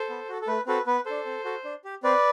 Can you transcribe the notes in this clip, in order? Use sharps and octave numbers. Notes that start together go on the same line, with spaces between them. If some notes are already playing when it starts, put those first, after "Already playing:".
Already playing: A4 C5
B3
F#4 A4
A4
A3 B4
C4 F#4 A4 B4
B3 B4
D4 A4 C5
C4
F#4 A4
D4
G4
C4 B4 D5